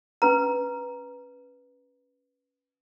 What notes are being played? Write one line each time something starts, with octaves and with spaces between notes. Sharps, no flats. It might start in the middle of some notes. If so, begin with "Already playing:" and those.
C#4 B4 A#5